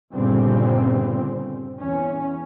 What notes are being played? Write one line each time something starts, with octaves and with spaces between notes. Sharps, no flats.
G1 A#2 C#3 G3 C4
E2 C#4